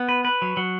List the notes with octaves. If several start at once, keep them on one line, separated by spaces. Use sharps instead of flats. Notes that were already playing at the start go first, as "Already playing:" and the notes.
Already playing: B3
B4
B4
F#3
F#3